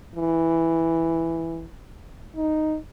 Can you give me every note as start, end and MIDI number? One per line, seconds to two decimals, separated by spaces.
0.15 1.65 52
2.36 2.76 63